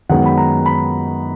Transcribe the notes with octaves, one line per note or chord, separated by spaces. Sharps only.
F#2 D#3 G#3 B3 D#4 F#5
B5
A#5
B5